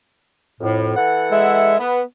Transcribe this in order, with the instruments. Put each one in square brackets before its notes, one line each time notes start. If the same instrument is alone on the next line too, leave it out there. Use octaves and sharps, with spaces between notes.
[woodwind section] F2 A2
E3 A4 F#5
[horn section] G#3 E5
B3